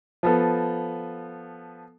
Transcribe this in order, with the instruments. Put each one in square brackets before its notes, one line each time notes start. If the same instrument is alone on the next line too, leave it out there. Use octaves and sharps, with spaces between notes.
[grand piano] F3 B3 A4